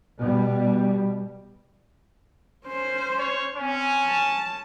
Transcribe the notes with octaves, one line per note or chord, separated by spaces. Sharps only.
B2 G3
C#4 C5
C#5
C4 C#4
A5